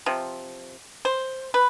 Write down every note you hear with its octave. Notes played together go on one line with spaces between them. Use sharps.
C3 F3
C5
B4